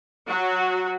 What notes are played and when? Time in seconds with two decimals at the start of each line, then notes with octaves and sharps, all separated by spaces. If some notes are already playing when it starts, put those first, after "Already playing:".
0.28 F#3 F#4